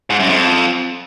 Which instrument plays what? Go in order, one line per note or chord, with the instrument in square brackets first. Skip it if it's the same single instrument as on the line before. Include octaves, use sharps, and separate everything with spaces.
[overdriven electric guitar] G#2
F#2
F2